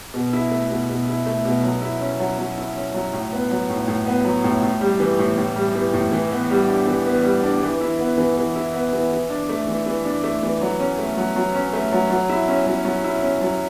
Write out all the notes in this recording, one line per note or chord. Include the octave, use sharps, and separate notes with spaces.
B2
E4
A3
B2
B2
E4
A3
B2
F#3
E4
C#4
F#3
F#3
E4
C#4
F#3
A2
B3
F#3
A2
A2
B3
F#3
A2
A2
G3
E3
A2
A2
G3
E3
A2
E3
B3
G3
D4
E3
B3
G3
D4
E3
E4
B3
E3
E3
E4
B3
E3
E3
D4
A3
E3
E3
D4
A3
E3
F#3
C#4
A3
F#3
F#3
C#4
A3
F#3
F#3
E4
C#4
F#3
F#3
E4
C#4
F#3